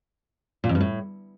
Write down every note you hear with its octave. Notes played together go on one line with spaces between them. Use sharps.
A#2
F2
G2
A2